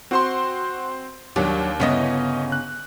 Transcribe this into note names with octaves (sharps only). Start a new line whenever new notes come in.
C4 F#4 C5 C6
D#2 F#3 D4 G4
G1 C#3 B3 C#4 E4 D#5
F#6